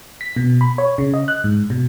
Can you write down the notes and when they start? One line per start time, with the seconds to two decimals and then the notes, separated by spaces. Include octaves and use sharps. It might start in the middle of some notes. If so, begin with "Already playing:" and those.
0.21 B6
0.36 B2
0.61 B5
0.78 C#5
0.98 C#3
1.14 D#5
1.28 F#6
1.44 G#2
1.70 B2